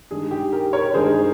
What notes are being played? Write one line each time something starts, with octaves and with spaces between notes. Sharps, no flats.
G2 D#3 G#3 G#4
G4
G4 A#4
A#4 C#5
G2 D#3 G#3 G#4 C5